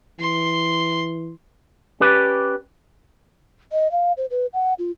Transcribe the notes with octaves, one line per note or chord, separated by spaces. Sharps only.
E3 C6
C#4 G4 B4 D5
D#5
F5
C5
B4
F#5
F4